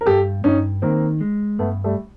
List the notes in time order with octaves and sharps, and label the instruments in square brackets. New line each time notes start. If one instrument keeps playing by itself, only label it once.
[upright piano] A#4
[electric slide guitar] G2 [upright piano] G4 A4
[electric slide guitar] G2 [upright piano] C#4 D#4
[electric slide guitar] D#3 [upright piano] A#3 C4
[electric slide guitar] G#3
[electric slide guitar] G2 [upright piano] A3 B3
[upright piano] G3 A3